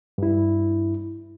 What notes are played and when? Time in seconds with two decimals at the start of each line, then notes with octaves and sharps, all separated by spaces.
0.18 G2 E4